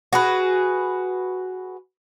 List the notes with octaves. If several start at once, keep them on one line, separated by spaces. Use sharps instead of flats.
F#4 G#4 B4